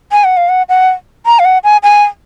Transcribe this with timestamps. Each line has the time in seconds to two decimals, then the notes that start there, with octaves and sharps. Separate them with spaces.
0.12 G#5
0.24 F#5
0.37 F5
0.49 F#5
0.69 F#5
1.26 A#5
1.39 F5
1.45 F#5
1.64 G#5
1.83 G#5